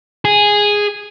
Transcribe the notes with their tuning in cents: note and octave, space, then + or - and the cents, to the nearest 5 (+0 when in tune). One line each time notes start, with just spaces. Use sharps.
G#4 -5